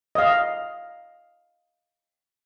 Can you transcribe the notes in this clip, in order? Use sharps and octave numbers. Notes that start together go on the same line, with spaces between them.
D#5 F5